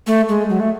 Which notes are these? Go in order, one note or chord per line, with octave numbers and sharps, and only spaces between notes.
A3
G#3
F#3
A3